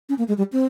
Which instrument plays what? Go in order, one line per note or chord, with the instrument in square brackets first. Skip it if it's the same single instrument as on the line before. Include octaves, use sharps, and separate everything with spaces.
[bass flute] C#4
A#3
G#3
G3
C4